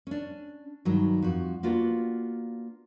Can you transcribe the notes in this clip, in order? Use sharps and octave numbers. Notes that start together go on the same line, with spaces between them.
C#4 D4
G2 D#3 F#3
F2 F#4
A#3 B3 D4 F4 F#4